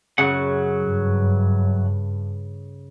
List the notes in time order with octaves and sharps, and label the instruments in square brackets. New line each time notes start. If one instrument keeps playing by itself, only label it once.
[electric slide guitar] F#2 F#3 F#5 [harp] C#3
[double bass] G2